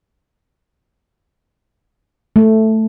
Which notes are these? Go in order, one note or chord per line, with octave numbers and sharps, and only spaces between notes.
A3